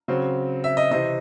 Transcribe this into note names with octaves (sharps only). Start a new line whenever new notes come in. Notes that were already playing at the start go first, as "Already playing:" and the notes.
C#3 F#3 C4
E5
D#5
C3 E3 C4 D#5